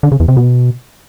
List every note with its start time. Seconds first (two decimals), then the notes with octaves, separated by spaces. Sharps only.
0.03 D3
0.12 C#3
0.20 E2
0.28 C3
0.37 B2